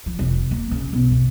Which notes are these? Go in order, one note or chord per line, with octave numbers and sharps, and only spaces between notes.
F3
F1
A#3
C#3
B1
C3